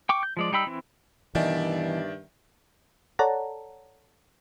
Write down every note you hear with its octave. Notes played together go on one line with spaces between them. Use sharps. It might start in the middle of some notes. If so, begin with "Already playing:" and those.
G5 C#6 D6
G6
F3 G#3 D5
G3 D#4 G5 B5 E6
E3 C4 E4
G2 B2 D#3 E3 D5 E5
A4 C#5 D5 F#5 A5 A#5